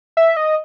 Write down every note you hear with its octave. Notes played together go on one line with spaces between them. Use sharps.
E5
D#5